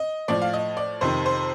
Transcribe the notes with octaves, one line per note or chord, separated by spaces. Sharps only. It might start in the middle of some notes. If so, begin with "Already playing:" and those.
Already playing: D#5
A2 F3 D5
F5
D#5
D5
F2 C3 D#3 C5
C5